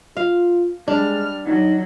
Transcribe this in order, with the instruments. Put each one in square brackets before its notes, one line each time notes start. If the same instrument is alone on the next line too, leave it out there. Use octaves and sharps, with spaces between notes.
[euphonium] F4 [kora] F5
[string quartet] G3 F6 [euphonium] G#3 [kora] D4
[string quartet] F#3 [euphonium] D#4